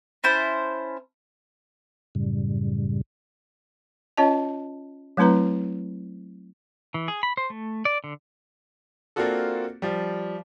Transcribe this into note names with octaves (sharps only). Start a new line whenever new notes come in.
C#4 E4 C5 A5
F#2 A2 C#3 G3
C#4 F4 C#5 D#5 A5
F#3 A3 C4 E4 B4 A#5
E3
G#4
B5
C5
A3
D5
D3
A#3 C4 D4 F4 F#4 A4
F3 G3